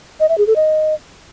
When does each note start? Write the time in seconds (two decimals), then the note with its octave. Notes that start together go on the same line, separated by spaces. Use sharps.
0.20 D#5
0.29 E5
0.38 G#4
0.47 A4
0.56 D#5